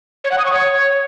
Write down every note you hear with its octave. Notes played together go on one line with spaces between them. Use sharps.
C#5
F#5
D#6
C#6
C#5